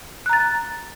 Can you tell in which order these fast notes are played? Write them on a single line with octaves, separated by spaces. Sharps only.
F#6 A#5 A6